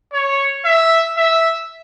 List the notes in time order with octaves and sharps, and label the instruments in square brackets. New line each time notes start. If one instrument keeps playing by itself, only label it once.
[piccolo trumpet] C#5
E5
E5